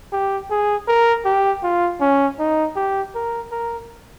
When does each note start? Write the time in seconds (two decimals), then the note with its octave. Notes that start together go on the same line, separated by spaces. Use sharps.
0.13 G4
0.50 G#4
0.88 A#4
1.25 G4
1.63 F4
2.01 C#4
2.39 D#4
2.76 G4
3.15 A#4
3.51 A#4